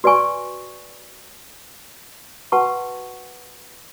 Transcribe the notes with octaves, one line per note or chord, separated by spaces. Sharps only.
F#4 B4 D5 G#5 C#6
F#4 B4 F#5 A5 C#6